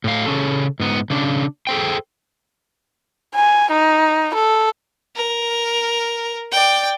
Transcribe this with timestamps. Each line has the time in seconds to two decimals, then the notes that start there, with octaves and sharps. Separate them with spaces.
0.04 A2 F5
0.26 C#3 C#4 A4
0.80 G#2 B3
1.10 C#3 D4
1.67 G#4 A4 C5 G5
3.35 G#5
3.71 D#4
4.35 A4
5.16 A#4
6.52 D5 G5